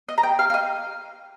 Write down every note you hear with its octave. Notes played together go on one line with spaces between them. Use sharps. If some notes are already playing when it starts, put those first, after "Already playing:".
D#5
A#5
G5
F5
F5
D#5